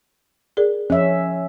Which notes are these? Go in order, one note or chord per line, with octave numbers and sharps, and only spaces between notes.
G#4 A#4 D5
F3 C#4 E5